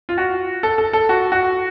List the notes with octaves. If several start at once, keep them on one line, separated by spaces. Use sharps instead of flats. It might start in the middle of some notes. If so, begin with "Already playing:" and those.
F4
F#4
A4
A4
A4
F#4
F#4